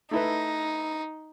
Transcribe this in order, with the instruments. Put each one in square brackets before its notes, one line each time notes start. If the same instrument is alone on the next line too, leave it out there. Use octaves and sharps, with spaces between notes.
[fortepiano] A3 E4 B4 [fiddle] D#4